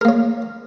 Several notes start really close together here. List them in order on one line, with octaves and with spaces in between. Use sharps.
A#4 A#3 C#5